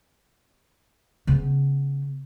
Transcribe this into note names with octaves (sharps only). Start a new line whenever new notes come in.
C#3 B3